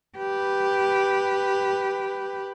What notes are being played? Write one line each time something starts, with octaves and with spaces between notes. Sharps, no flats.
G4 B4